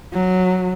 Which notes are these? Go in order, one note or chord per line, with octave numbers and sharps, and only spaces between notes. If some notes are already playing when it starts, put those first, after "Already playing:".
F#3